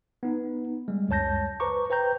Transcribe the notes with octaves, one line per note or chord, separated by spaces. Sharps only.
B3 D#4
G3 G#3
C#2 F#2 C#5 A5 G6 A#6
B4 C5 A#5 C#6 D6
B4 C5 G5 A#5 G6